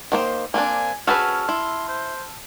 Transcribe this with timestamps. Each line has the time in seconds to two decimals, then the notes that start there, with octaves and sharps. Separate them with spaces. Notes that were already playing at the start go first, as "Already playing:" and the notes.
0.12 D#3 A#3 C5
0.54 A#3 C4 D4 G#5
1.07 C#4 F#4 G#4 B4 A5 E6 F6
1.49 E4 C6
1.88 C5